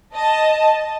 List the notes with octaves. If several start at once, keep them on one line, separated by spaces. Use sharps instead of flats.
D#5 A5